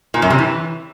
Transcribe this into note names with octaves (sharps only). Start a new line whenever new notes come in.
A#2
F#2
C3
E3